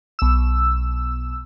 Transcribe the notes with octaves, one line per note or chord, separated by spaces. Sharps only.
B1 E6